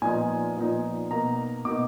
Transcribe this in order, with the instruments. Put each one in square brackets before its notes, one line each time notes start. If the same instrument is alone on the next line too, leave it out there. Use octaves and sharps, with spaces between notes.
[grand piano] A#2 F3 B3 D#4 G#5
A#2 F3 B3 D#4
B2 A#3 D#4 A#5
B2 A#3 D#4 D6